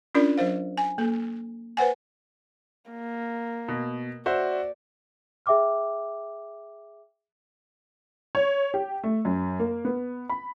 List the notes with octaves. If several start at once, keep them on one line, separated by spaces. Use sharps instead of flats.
C#4 D4 F4 A#4 D5
F#3 A#4 C5 F5
G#5
A#3 A4
B4 C5 F#5 G#5
A#3
B2
F#4 C5 D5 E5
G#4 E5 G5 D6 F6
C#5
G4
A3
F#2
A#3
B3
B5